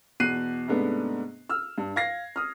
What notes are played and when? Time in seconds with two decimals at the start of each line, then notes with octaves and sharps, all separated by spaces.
0.20 E2 B2 F#6 C7 D#7
0.68 G#2 C3 A3 B3 D4
1.49 E6 F6
1.78 G2
1.96 F5 G#6 A#6 C7
2.36 D#6 F6